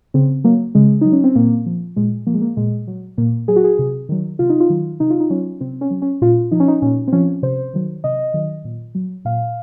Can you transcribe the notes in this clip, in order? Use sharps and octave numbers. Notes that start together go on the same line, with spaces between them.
C#3 C4
F#3 A#3
C#3 G#3
F#3 D#4
C#4
C4
A#2 A#3
F3
A#2 G#3
F3 A#3
G#3
A#3
A#2 G#3
F#3
A#2 A#3
F#3 G#4
F#4
G#4
C3
D#3 F#3
C3 F4
D#4
F4
D#3 F#3
C3 D#4
F4
D#4
F#3 C#4
C3 C4
C#4
F#3
C#4
A#2 F4
F3 D#4
C#4
D#4
A#2 C#4
C4
F3 C#4
C3 C5
D#3 F#3
C3 D#5
D#3 F#3
A#2
F#3
A#2 F5